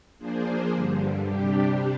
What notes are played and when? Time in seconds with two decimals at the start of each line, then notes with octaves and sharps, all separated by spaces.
0.18 F3 A#3 D4 G#4 C5
0.72 G2 D3 G3
1.25 C3 G3 D4 G4